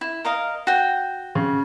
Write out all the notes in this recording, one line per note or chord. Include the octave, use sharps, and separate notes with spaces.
E4
A#4 D#5 F5
F#4 G5
C#3